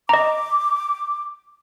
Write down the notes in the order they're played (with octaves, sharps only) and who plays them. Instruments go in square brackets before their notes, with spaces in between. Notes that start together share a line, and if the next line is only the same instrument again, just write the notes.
[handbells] D#5 A#5 [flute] D6